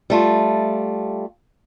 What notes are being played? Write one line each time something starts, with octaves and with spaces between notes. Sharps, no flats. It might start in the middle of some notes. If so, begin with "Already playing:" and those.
G3 A3 F4